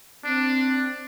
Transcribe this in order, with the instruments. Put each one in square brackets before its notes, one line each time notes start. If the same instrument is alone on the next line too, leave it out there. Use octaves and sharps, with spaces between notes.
[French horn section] C4 [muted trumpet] D4